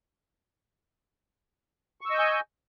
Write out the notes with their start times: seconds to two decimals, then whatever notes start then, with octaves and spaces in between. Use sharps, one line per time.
2.01 C#6
2.06 E6
2.10 D#5
2.15 G6
2.19 G#5